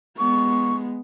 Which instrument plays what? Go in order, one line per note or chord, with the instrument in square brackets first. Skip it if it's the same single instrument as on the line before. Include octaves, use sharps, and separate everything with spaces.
[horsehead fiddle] G#3 B3 [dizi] C#6